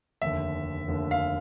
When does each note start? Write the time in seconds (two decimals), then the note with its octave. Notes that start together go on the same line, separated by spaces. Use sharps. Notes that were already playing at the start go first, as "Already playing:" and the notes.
0.22 F1 D#2 D3 E5
0.88 F1 D#2 D3
1.11 F5